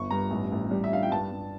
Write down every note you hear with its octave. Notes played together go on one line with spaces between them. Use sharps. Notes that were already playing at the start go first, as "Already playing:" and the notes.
Already playing: G1 C#6
G2 A#5
A1
A1
G3
E5
D4 F5
G5
G2 A5
G2